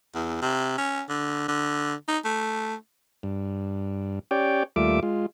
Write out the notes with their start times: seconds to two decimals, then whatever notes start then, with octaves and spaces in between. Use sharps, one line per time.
0.15 E2
0.42 C3
0.78 C#4
1.09 D3
1.48 D3
2.08 D#4
2.25 A3
3.23 G2
4.31 C#4 G4 C#5 D5 G5
4.76 D#2 G3 A3 F4 E5 D6
5.03 G#3 F4